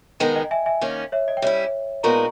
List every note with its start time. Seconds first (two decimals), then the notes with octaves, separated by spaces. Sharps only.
0.20 D#3 G#3 B3 D#4 A#4 D#5 G5
0.36 D#5 G5
0.51 E5 G#5
0.66 E5 G#5
0.81 D#3 A#3 C#4
1.12 C#5 E5
1.28 D#5
1.37 G5
1.42 G3 C#4 E4 C#5 E5
2.03 A#2 G#3 B3 D#4 A#4 A#5 C#6